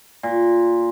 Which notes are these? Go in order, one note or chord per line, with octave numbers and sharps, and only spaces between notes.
A#2